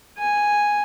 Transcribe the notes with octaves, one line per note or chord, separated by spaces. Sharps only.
G#5